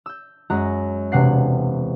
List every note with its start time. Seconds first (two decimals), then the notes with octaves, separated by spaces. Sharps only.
0.06 E6 G6
0.50 F#2 G#3 F#4 A#5
1.12 E1 C3 F#5 C7